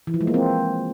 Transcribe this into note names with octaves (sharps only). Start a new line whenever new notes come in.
E3
F3
G#3
A#3
C4